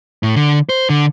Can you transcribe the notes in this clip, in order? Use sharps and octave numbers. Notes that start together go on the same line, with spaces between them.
A2
D3
C5
D3